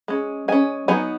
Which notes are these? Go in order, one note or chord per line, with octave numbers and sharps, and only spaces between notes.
G#3 C#4
G#3 C#4 G#5
F#3 B3 D#4 G#5